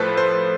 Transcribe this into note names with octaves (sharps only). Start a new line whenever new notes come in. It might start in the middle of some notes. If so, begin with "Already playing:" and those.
Already playing: A2 F3 A3 A4 B4 C5
C5